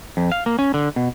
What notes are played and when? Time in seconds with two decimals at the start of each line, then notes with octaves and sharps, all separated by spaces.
0.17 F2
0.32 F5
0.46 A#3
0.59 C#4
0.74 D3
0.96 B2